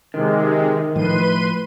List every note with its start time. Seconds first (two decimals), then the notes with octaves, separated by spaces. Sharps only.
0.14 C3 D#3 G#3
0.96 A2 F3 B4 C6 D#7